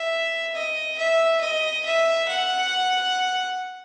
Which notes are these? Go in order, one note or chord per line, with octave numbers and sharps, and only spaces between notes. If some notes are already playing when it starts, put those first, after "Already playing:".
Already playing: E5
D#5
E5
D#5
E5
F#5